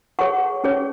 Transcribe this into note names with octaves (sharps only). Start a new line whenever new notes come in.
G#4 C#5 F#5 C#6
C#4 G#4 C#5